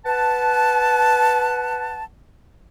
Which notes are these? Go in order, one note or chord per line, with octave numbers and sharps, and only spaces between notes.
B4 F#5 A5